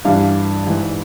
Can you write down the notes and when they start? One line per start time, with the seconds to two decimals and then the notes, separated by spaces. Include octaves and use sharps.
0.05 G2 E3 F5
0.67 G#2 E3